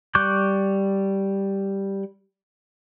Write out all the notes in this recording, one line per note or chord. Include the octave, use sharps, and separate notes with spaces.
G3 C#6 D6 F#6 G6